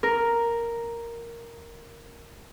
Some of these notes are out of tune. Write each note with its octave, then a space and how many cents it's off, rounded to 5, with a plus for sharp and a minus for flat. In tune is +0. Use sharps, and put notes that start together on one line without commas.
A#4 +0